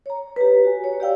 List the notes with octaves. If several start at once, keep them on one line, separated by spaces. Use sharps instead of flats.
C#5 A#5
G4 B4
F#4 G#5
C#5
G4 D5 F5 G5 E6